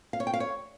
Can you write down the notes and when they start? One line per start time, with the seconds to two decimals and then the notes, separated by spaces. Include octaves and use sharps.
0.13 F5
0.20 C#5
0.27 G5
0.34 F5
0.40 C#5